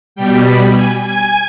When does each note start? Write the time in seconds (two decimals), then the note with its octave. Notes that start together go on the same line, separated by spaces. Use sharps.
0.16 B2 G3 G5
0.45 B5
0.75 G#5
1.03 G#5